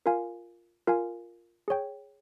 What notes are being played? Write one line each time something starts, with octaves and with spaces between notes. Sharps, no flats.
F4 A#4 F5 G#5
F4 A#4 F5 G#5
G#4 C#5 G5